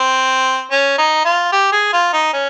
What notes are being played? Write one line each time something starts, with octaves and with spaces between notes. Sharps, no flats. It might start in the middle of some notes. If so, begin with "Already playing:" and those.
Already playing: C4
C#4
D#4
F4
G4
G#4
F4
D#4
C#4